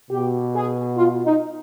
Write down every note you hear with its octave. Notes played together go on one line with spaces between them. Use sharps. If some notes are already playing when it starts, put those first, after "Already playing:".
B2 G4
G#4
F4
D#4